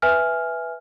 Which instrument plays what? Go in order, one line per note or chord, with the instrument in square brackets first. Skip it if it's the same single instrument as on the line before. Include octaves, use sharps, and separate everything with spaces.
[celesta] B4 E5 G#5 F6